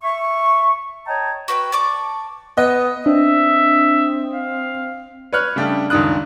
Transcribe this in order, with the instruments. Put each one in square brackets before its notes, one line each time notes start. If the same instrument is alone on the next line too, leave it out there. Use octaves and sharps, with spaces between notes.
[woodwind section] E5 C#6
C#5 D#5 G5 A5 A#5
[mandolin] F#4 B4 D#5 G5
D5 A5 C#6 D6
[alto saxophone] B3 [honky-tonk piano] D#5
[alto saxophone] C4 [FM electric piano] D4 [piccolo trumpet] E5
[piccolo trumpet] F5
[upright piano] B4 C#5 F6 F#6
C#3 G3 A3 D4 G4
C#2 F#2 D#3 D4 D#6 F#6